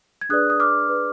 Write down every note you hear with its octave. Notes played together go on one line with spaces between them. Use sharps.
G#6
D4 G#4 B4 D5 D#6 F#6
D#6
D6 F6
D4 G#4 B4 D5